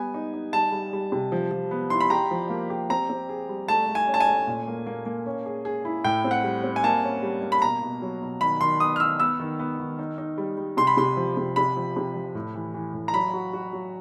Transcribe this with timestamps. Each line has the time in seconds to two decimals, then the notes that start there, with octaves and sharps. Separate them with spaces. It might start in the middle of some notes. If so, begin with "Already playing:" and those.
Already playing: G3 B3 G#5
0.14 D#4
0.34 D#4
0.53 G3 A5
0.72 G3
0.93 G3
1.12 C3
1.32 F3
1.51 F3
1.71 B3
1.90 E4 C6
2.01 B5
2.10 G4 A#5
2.31 F3
2.50 A#3
2.70 G4
2.90 C4 A#5
3.09 C4
3.29 G#4
3.49 G3
3.68 A3 A5
3.89 A3
3.95 G#5
4.08 C#4
4.14 A5
4.20 G#5
4.27 A3
4.47 A#2
4.67 A#3
4.87 A#3
5.06 A#3
5.26 C#4
5.46 G#4
5.65 G#4
5.85 E4
6.04 A2 G5
6.24 C4
6.31 F#5
6.44 G3
6.64 C4
6.76 G#5
6.83 A#3 A5
7.04 C#4
7.22 G3
7.42 A#3
7.52 B5
7.62 B2 A#5
7.82 B2
8.02 F#3
8.21 B2
8.41 D#3 B5
8.61 D#3 C6
8.80 B3 D#6
8.96 F6
9.00 D#3 E6
9.20 B3 E6
9.40 D#3
9.59 B3
9.80 D#3
9.99 D#4
10.18 D#4
10.38 G3
10.57 G3
10.77 C3 C6
10.87 B5
10.97 C3 C6
11.17 F3
11.37 C3
11.56 C3 B5
11.77 F3
11.96 C3
12.16 F3
12.35 A2
12.55 E3
12.74 E3
12.94 A2
13.08 A#5
13.14 F#3 B5
13.33 F#4
13.53 F#4
13.73 F#3